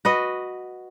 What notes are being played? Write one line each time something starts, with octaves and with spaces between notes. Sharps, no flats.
F#4 B4 D#5